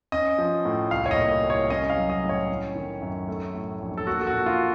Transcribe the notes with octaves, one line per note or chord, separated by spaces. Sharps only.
C#4 D#5
F3
A2
C2 F5
C#5
D#5
A#2
C2
C#5
C#4 D#5
F5
F#3
D#5
A2
C#5
C#4
D#3
F#2
A3
A2
A#1
A4
A#3 F#4
A4
F#4
A#2
F4